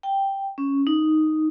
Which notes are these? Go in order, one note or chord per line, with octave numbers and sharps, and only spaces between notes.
G5
C#4
D#4